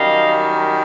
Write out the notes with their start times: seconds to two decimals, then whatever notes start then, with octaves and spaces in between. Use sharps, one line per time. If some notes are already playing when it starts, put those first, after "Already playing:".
Already playing: F#2 D#3 G3 D#5 F5